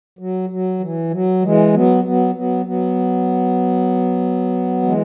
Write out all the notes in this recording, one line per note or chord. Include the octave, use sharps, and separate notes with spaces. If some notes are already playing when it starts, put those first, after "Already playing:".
F#3
F#3
E3
F#3
E3 G#3
F#3 B3
F#3 B3
F#3 B3
F#3 B3
E3 G#3